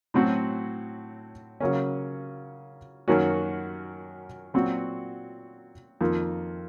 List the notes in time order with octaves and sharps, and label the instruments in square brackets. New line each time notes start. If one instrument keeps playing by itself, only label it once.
[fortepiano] A2 F#3 C4 F#4
C#3 F#3 A#3 C#4
F#2 D#3 A#3 C#4 F#4
A#2 F#3 C4 F#4
F2 D#3 A#3 F4